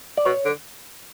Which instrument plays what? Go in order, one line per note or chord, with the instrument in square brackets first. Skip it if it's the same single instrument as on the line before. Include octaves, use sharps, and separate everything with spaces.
[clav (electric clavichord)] D5
[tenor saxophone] B2 [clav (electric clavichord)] C#5
[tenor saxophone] D3